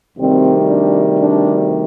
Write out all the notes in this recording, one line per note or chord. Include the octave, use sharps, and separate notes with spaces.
D2 C3 D#3 G3 C4
D4
D4